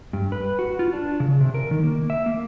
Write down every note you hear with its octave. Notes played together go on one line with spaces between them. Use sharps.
G2
B4
F#4
F4
D4
C#3
C3
A#4
D#3
A#3
E5
A#3